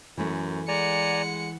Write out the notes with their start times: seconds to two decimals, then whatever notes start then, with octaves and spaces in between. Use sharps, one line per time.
0.18 F#2 E3 A3
0.68 G#3 D5 F#5 G#5 A#5 C#7